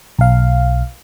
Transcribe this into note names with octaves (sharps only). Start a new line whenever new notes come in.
B1 F5